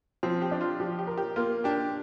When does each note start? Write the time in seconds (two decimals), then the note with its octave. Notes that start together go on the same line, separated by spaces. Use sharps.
0.23 F3 C4
0.42 G4
0.51 D4
0.61 F4
0.80 F3 G4
0.99 G4
1.07 A#4
1.17 G4
1.36 A#3 F4
1.64 D4 G4